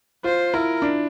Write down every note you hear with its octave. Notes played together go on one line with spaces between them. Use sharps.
F4 C5
E4 A#4
D4